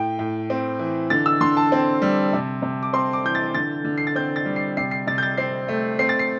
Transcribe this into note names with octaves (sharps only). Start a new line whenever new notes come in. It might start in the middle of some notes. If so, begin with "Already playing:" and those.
Already playing: A2 G5
A2
C4
E3
D3 A6
E6
D3 C6
A5
C4
G3
C3
C3
D6
C4 C6
D6
E3 G6
A6
D3 A6
D3
C7
A6
C4 G6
A6
G3
C7
C3 C7
C7
C3 A6
G6
A6
C4 C7
A3
C4 C7
A6
C7